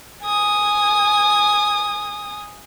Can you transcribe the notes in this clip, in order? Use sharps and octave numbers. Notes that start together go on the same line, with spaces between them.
G#5 D#6